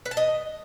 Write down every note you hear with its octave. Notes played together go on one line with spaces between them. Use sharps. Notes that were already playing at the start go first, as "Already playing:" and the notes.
B4
A5
D#5